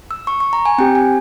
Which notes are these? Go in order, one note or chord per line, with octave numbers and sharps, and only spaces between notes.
E6
C#6
C#6
A#5
G#5
C4 G4 G5
G#5